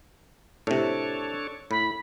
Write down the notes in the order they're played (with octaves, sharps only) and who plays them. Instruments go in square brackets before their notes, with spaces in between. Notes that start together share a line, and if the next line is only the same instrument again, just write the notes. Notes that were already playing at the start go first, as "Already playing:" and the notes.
[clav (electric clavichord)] A2 C3 [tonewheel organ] D4 A4 C#5
[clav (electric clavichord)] A2 [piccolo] B5